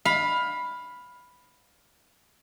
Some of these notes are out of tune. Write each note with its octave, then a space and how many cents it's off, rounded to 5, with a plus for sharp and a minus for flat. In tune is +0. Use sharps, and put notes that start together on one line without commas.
F5 +20 B5 +0